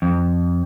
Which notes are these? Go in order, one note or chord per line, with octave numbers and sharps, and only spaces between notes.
F2